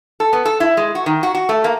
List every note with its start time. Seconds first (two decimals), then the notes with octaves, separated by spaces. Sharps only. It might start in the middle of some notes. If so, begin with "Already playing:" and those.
0.20 A4
0.33 B3
0.45 A4
0.60 E4
0.77 G#3
0.95 F#4
1.06 D#3
1.23 F#4
1.35 F#4
1.49 A3
1.64 A#3